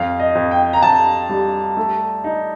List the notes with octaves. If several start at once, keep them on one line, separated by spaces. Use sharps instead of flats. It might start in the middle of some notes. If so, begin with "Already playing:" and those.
Already playing: F2 F5
D#5
F2
G5
A#5
F2 A5
G3
A3
D#4